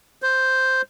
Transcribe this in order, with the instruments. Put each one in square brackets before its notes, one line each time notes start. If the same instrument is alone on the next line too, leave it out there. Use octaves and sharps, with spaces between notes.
[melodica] C5